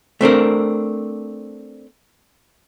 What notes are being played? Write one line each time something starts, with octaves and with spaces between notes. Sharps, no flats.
A3 C4 D4 A#4